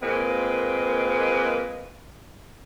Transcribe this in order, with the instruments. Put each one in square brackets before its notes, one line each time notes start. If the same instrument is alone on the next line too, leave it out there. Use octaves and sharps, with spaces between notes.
[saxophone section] A#2 G#3 A#3 C4 B4